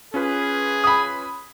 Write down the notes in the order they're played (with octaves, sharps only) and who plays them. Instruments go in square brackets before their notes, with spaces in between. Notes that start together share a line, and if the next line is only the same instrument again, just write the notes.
[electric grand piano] C#4 F4 B4 [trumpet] G#4
[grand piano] B5 D#6